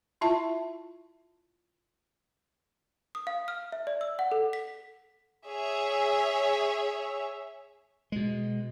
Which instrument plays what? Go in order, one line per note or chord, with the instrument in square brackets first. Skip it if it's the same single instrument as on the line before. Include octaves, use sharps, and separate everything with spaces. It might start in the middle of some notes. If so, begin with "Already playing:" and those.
[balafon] E4 F4 E5 A5
[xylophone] D#6
F5
F6
E5
D5
E6
F#5
A4
B6
[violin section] G#4 C#5 E5
[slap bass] B2 G#3